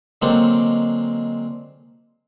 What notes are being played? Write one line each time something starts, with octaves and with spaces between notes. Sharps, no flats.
D3 F#3 G#3 A#3 C4 D4